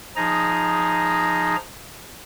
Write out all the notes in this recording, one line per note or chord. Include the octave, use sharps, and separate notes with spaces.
F3 D#4 G#4 A#5